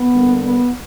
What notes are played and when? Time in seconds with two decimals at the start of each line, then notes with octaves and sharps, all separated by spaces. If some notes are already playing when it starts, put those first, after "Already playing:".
Already playing: B3
0.13 D3 G3 A#3
0.43 B3